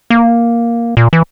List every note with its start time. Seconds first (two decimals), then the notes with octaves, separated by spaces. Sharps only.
0.10 A#3
0.97 A#2
1.13 E3